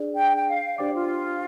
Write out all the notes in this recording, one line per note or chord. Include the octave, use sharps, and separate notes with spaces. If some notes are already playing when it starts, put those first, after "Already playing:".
Already playing: D4 G#4 D5
G5
G5
F5
D4 G4 C5 D5 G5 D6
F4